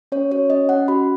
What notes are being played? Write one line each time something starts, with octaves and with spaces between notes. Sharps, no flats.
C#4 C#5
F#4 C#5
C#4 D#5
C#4 F#5
F#4 B5